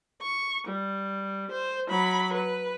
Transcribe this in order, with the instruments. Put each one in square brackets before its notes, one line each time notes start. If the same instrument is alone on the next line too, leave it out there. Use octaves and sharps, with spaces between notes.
[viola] C#6
G3
C5
F#3 B5
B4